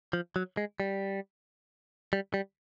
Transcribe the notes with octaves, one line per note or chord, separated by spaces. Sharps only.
F3
F#3
G#3
G3
G3
G3